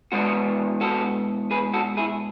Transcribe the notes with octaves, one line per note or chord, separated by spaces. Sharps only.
B2 G#3 B3 D4 F#4
F#4 A4
G#4 B4
F#4 A4
E4 G#4